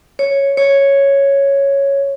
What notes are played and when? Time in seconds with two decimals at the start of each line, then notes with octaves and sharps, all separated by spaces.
0.19 C#5
0.57 C#5